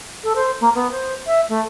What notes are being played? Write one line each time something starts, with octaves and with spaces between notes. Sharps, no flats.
A4
C5
A#3
B3
C5
E5
A3